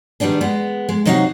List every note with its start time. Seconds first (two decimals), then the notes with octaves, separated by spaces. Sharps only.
0.20 D#3 G3 B3 D4 G#4
0.41 G#3 B3
0.89 G#3
1.05 C3 F#3 D#4 F#4 E5 F5